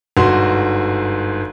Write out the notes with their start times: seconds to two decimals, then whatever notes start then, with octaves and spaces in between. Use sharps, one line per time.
0.17 G1 G#2 F#4 C6